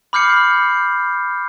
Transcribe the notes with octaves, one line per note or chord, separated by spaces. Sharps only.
B5 D6 F6 G6 C7 C#7